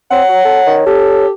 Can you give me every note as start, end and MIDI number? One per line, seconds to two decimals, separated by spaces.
0.11 0.22 60
0.11 1.26 73
0.11 0.77 78
0.28 0.43 54
0.45 0.61 69
0.67 0.86 51
0.86 1.31 67
0.86 1.29 69